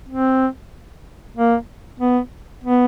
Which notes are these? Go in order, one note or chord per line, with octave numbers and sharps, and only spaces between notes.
C4
A#3
B3
B3